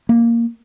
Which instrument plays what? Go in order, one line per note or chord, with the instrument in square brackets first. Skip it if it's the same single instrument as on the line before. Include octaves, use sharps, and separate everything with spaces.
[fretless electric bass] A#3